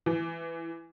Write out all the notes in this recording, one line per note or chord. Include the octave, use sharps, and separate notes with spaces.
E3